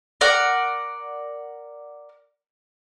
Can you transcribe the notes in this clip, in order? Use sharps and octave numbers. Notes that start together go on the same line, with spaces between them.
A#4 D5 F#5